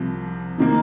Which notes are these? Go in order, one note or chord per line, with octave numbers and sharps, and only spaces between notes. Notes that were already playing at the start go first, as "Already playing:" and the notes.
Already playing: C2 C3 F3
C3 D#3 A#3